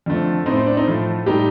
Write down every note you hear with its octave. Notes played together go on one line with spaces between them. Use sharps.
F2 D3 F3 A3
A2 A3 C4 D#4
C4
D4
C4 D#4
A2 F3 A3
A2 G3 D#4 G4